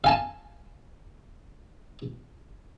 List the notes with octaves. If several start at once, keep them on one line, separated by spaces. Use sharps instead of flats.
F5 G#5 A5